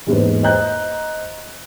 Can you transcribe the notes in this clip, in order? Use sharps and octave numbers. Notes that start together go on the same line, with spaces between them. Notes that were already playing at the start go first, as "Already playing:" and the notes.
E2 G#2 G#3 A#3 B4 C5
C5 D#5 A#5 F#6 G6